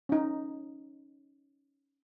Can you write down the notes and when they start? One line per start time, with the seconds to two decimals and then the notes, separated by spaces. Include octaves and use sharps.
0.09 C#4 D#4